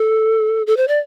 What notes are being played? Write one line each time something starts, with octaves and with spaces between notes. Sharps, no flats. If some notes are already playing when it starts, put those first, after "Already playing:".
Already playing: A4
A4
C5
D5